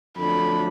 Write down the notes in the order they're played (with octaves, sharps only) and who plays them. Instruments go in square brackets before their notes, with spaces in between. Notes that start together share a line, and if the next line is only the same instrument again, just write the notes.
[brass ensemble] F2 D3 F#3 A3 D4 [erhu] B5